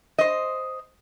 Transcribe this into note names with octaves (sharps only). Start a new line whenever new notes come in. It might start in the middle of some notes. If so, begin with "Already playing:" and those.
C5 D#5